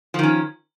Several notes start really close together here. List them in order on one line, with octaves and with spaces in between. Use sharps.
F3 D#3 C#4